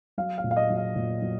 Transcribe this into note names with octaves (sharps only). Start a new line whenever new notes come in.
F#3 F5
F5
A#2
F5
D#5
F#3
F5
A#2
F#3